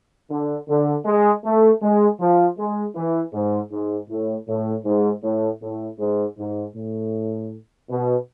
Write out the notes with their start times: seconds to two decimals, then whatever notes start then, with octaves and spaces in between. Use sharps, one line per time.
0.29 D3
0.68 D3
1.05 G#3
1.44 A3
1.81 G#3
2.19 F3
2.58 G#3
2.95 E3
3.33 G#2
3.71 G#2
4.09 A2
4.47 A2
4.84 G#2
5.22 A2
5.61 A2
5.98 G#2
6.37 G#2
6.75 A2
7.89 B2